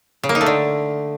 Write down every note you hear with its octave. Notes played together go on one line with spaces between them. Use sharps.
C#3
A#3
D#4
A3
D3